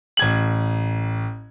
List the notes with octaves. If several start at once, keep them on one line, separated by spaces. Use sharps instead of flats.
A1 G#6 F#7